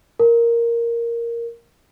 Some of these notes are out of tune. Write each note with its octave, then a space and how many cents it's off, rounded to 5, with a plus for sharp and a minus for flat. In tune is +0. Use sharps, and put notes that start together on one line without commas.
A#4 +0